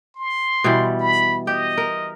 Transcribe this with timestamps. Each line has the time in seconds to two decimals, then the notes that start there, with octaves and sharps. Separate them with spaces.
0.16 C6
0.64 B2 E3 G3
1.00 B5
1.47 G4 D#5
1.77 A#4